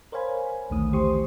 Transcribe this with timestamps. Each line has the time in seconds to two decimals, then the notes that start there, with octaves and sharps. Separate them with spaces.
0.12 A#4 C5 C#5 F5 G#5 B5
0.70 B1 E2 D3 D#3 A3 D#6
0.93 E3 G4 C5 C6 C#6 D#6